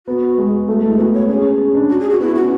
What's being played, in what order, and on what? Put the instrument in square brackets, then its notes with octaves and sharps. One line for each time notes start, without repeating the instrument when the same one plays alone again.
[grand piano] B3 [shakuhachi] F#4
[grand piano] G#3
[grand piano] A3 [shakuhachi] F#4
[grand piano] G#3 [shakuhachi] E4
[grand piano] B3 [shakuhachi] F#4
[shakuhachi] C#5
[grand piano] C#4 [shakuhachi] G#4
[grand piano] C#4
D4
[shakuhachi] F#4
G#4
F#4
[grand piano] B3 [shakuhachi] E4
[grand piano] C#4 [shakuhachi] F#4